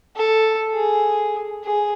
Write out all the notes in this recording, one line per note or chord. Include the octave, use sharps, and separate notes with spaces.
A4
G#4
G#4